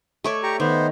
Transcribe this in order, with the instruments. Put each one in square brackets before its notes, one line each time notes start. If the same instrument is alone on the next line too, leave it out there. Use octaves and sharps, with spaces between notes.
[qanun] A3 C#5 D5
[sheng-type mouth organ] G4 A#5 C#6
[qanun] D#3 [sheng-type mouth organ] B3 C5